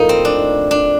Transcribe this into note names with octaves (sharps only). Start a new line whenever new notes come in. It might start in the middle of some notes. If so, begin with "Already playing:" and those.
Already playing: A2 F3 A#3 D#4
C4
D4
D4